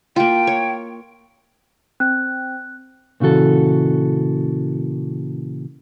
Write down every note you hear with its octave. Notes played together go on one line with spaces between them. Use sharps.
A#3 F4 G5
C#5
C4 F#6
A#2 C#3 E3 F#4 A4